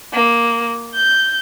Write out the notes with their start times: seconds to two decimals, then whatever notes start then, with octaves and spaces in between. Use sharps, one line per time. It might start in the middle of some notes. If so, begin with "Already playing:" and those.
0.13 A#3
0.94 G6